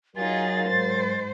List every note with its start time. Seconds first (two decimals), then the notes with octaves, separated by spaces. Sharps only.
0.16 F#3 D#4 F4 G#4 A#4 A6
0.66 G#2 C5